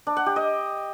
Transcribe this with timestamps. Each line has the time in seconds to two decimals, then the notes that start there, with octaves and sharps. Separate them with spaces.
0.07 D4
0.16 F#5
0.26 G4
0.36 D#5